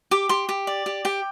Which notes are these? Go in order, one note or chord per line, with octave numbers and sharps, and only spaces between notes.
G4 D6
G4 C6
G4
D5
G4
G4 G5